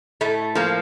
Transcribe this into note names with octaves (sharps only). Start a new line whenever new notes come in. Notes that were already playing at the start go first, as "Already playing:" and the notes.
A2 A3
F3 A#3